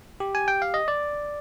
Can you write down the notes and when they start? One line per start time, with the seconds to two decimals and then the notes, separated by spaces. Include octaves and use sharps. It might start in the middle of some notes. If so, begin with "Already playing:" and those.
0.20 G4
0.35 G#5
0.48 G5
0.62 F5
0.74 D#5
0.88 D5